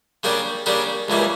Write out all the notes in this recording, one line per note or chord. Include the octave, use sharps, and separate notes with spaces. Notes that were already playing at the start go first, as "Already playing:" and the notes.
C#3 G3 A#3 D4 G4
C#3 G3 A#3 D4 G4
C#2 C#3 E3 G3 A#3